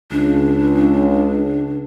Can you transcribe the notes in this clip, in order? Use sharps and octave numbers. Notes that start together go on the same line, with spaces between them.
C#2 D4